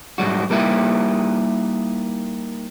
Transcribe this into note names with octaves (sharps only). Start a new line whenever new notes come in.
G#2 F#3 G3 F#4
G3 A#3 D#4 E4 G4